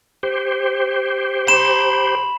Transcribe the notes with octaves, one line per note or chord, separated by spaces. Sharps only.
G4 C5
B5 C6 E7